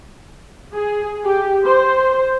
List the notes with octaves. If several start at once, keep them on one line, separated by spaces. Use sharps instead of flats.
G#4
G4
C5